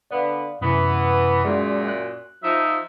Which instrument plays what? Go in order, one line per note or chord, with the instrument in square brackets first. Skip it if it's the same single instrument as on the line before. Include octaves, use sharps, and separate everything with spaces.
[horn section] D3 B3 [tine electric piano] D5 F5
[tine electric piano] F#2 C3 B4 [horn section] E3 B3
[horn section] F#2 A#2 [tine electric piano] G#3 G#4 D5
[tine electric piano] F#6
[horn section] F3 D#4 E5